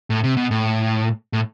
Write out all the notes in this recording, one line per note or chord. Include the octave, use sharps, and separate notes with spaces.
A2
C3
B2
A2
A2